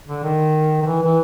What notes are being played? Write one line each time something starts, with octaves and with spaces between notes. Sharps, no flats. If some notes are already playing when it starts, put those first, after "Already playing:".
D3
D#3
D#3
E3
E3